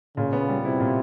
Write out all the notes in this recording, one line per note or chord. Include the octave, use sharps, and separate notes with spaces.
A#2 C#3
B3
G3
C3 E4
A#2